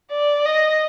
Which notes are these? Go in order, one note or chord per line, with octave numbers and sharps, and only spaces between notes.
D5
D#5